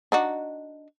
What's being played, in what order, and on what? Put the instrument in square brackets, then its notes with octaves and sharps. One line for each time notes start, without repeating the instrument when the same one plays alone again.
[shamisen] D4 D#4 F#4